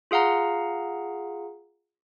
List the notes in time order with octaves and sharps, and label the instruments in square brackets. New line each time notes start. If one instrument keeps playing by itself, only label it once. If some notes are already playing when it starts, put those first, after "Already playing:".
[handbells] F4 G#4 F5 F#5 A#5